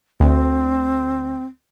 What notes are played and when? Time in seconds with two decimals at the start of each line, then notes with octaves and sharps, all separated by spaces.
0.20 D2 C4